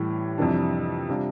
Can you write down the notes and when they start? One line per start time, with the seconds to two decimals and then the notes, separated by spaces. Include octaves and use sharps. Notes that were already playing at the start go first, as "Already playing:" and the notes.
Already playing: A2 E3 G3
0.38 F2 C3 E3 G3 D4
1.09 C3 G3 D4 F4